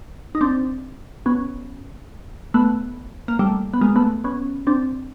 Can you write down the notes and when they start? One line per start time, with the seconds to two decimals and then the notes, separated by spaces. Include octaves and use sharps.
0.35 D#4
0.41 C4 D4
1.26 B3 C#4
2.54 A3 B3
3.28 A#3
3.39 G3 A3
3.74 B3
3.81 G#3 A#3
3.96 A3 B3
4.24 B3 C#4
4.67 C4 D4